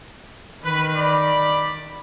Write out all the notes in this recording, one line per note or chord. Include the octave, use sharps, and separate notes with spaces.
D#3 B4
D5 B5